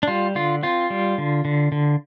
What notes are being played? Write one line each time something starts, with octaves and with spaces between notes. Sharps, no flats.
D4
G3 F4
D3 F4
C4 F4
G3
D3
D3
D3